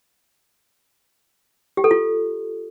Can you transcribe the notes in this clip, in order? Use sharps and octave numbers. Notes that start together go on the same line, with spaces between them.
G4
A4
F4